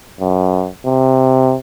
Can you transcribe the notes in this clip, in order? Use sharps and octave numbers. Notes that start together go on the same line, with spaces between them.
F#2
C3